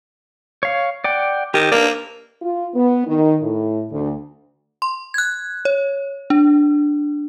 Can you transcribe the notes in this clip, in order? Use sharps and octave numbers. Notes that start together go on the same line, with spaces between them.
C#5 F5
D5 F#5 G5
D#3 G4
A#3 D4 B4 D5
F4
B3
D#3
A2
D2
C6
F#6 G#6
C#5
D4